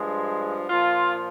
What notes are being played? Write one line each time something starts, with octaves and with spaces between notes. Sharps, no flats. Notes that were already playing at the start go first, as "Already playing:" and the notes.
Already playing: G2 F3 G#3
A#2 F3 F4